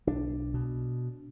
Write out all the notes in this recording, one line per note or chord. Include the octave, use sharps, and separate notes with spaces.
B1 D4
B2